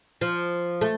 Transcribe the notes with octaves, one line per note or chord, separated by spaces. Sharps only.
F3
A3